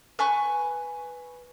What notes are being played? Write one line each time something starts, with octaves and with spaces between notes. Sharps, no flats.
B4 G#5 C#6 F#6